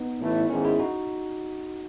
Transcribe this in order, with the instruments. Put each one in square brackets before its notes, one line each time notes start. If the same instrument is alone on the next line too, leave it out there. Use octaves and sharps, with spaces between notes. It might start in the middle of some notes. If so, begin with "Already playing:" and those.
Already playing: [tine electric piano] B3 D#4
[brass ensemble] A1 A2 E3 A3 E4
[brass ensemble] G#1 G#2 D#3 [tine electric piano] C#4 E4
[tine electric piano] E4 G#4
D#4 F#4